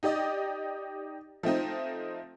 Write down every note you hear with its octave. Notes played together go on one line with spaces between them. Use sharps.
D#4 G4 D5 D#5
F3 A3 C4 D#4